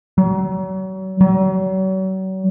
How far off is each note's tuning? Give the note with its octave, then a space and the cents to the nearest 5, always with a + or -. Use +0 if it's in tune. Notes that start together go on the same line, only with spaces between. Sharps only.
F#3 +40
F#3 +40